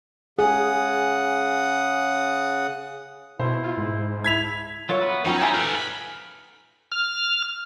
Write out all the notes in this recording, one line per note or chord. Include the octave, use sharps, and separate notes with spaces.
C#3 G#4 F#5 D#6
B2 E4 C5
F4
G#2
E4 G#6 B6 F7
F#3 F4 A#4 C#5 E5
B3 B4
F3 F#3 C#4 D#4 F#4 G5 A#5
E4 F4 G4 C5 G#5 A#5
A4 B4 F6
B5
F6